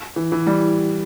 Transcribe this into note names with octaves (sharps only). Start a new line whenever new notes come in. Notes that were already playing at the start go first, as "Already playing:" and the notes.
E3
E3
G3